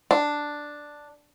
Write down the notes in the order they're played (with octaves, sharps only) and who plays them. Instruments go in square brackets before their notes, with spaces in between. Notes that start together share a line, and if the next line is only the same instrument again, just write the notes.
[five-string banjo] D4